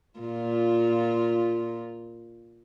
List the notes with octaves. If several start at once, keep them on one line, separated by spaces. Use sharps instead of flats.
A#2 F4